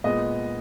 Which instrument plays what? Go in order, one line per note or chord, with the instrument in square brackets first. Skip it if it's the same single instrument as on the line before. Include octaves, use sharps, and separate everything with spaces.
[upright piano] A#2 G#3 B3 D#5